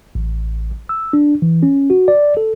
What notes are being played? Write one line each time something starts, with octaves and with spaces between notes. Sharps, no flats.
A1
E6
D4
E3
C#4
F#4
D5
A4